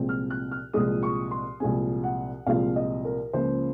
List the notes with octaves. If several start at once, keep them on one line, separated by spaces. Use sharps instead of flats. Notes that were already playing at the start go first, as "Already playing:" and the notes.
Already playing: C2 A#2 F3 G#3 C4
F6
F#6
F6
C2 A#2 F3 G#3 C4 D#6
C#6
C6
C2 A#2 F3 G#3 C4 G#5
F#5
C2 A#2 F3 G#3 C4 F5
D#5
A#4
C#2 C#3 F3 A#3 F4 C5